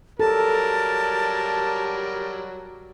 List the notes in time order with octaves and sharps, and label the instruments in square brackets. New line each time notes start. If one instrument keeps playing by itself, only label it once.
[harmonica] F#3 G3 [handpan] A4 [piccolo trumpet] A#4 [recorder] A5